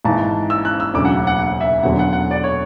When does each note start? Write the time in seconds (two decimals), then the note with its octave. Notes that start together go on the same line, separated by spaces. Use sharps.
0.05 G#1 G#2 E3 A5
0.50 E6
0.65 F#6
0.80 E6
0.94 E1 D2 C#3 F#3 D6
1.05 F#5
1.16 F#5
1.27 F#5
1.39 F#5
1.61 E5
1.83 E1 E2 D3 F#3 F#5
1.99 F#5
2.13 F#5
2.31 D5
2.44 C#5